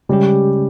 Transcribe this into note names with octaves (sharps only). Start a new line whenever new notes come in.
C#3 G3 G#3 C#4 G4